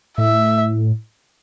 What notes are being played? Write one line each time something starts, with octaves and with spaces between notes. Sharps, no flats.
A2 E5